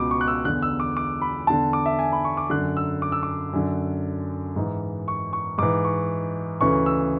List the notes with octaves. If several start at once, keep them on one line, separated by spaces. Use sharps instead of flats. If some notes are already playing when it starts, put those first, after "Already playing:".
Already playing: C#2 B2 D6
C#6
F#6
E6
E2 D3 F#6
E6
D6
D6
B5
E2 D3 A5
D6
E5
G#5
B5
C#6
D6
F#2 D3 F#6
E6
D6
E6
D6
F#2 D3
G#2 E3
C#6
C#6
G#2 E3 D6
C#6
D2 C#3 E3 C#6
E6